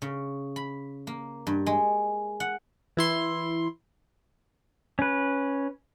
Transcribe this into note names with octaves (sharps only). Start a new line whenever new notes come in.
C#3
B5
A#3
G2
G#3
F#5
E3 E4 C6
C#4 B4